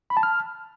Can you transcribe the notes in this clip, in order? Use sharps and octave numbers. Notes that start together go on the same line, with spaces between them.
B5
A5
F6